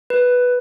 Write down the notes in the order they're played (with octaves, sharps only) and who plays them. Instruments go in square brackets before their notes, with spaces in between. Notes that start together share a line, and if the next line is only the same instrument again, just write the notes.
[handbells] B4